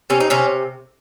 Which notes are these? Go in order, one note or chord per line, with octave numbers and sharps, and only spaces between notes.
C3 C#4
D#4
C3 C#4